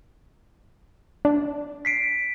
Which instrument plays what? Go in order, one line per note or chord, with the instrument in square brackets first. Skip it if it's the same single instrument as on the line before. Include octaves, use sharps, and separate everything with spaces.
[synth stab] D4
[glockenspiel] B6 C7 D7